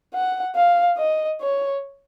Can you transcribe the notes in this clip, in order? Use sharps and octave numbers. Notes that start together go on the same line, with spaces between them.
F#5
F5
D#5
C#5